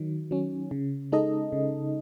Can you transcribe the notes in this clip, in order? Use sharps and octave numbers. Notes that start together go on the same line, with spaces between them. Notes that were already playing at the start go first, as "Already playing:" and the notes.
Already playing: D#3 F#3
F#3 C#4
C#3
G#3 D#4 A4 D#5
C#3